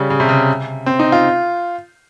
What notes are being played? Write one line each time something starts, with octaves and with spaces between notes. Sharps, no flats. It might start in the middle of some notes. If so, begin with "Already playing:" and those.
Already playing: C#3 G3
C#3
C3
C#3
C4
D#4
F4